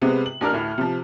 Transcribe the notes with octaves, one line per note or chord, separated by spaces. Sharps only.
C3 G#3 B3 C4
F#7
A1 D4 A#4 F6
D2 A2
C3 F3